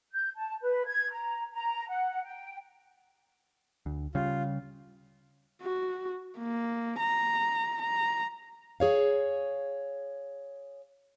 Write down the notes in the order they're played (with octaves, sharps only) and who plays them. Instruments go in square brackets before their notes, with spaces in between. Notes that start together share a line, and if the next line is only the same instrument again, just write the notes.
[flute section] G6
A5
B4
G#6
A#5
A#5
F#5
G5
[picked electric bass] D2
[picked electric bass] C#3 G3 [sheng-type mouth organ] F4
[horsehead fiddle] F#4
A#3
A#5
A#5
[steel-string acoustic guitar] G#4 C#5 F5